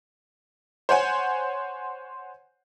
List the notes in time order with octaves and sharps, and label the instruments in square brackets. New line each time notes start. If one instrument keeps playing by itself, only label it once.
[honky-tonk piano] C5 C#5 F#5 G#5